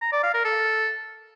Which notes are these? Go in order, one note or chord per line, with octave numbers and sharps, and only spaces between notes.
A#5
D5
F5
A#4
A4